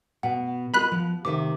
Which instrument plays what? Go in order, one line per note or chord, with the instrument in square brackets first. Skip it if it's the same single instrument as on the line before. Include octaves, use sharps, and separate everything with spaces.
[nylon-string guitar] B2 [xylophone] F#5
[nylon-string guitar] F4 A#4 D#5 [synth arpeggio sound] B5 F#6
[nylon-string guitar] F3
[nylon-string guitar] C3 D#3 E5 [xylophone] D6